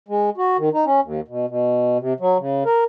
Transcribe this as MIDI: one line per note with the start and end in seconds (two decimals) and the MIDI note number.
0.08 0.30 56
0.37 0.57 66
0.58 0.69 51
0.73 0.85 63
0.85 1.00 61
1.02 1.21 39
1.28 1.46 47
1.48 1.98 47
1.99 2.13 48
2.20 2.37 54
2.39 2.63 49
2.66 2.84 70